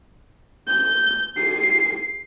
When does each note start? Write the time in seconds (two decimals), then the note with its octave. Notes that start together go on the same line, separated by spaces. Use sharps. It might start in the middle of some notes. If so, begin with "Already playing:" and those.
0.67 G6
1.37 C7